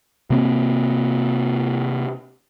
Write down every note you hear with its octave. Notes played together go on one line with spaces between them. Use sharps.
C3 A#3 C4